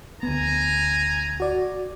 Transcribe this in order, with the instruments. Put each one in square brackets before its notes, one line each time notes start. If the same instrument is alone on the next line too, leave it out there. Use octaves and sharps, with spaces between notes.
[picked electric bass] D2 B3 [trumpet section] G#5 A#5
[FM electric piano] F#4 D5